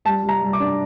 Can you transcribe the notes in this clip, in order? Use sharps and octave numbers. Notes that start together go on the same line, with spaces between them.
G3 A5
G3
A#5
G3
D6
D4